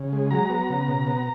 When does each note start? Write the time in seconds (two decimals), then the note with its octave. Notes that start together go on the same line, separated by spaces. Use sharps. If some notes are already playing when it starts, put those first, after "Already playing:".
Already playing: C#3
0.13 G#3
0.31 F#3 A#5
0.50 B3
0.70 C#3
0.88 B2
1.07 B3